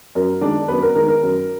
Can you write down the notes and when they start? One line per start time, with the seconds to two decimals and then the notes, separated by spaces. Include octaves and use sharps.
0.15 F#2 A#4
0.41 D#3 G#3 D4 D5
0.68 F#2 B3 B4
0.82 A#4
0.95 D#3 G#3 A#4
1.08 A#4
1.22 F#2